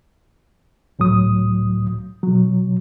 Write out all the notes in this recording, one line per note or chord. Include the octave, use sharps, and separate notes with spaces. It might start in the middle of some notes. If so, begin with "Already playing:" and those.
C#2 A2 F#3 D#6
B2 F#3